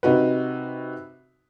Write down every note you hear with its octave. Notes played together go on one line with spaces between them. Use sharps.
C3 D#4 F#4 B4